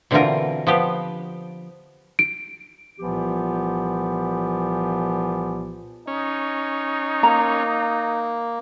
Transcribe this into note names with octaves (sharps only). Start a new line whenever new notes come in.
B2 D3 E3 C4 F4 A#4
F3 B3 G4
D7
C2 A#2 E3 F3 B3 G4
C#4 D#4
A#3 A#5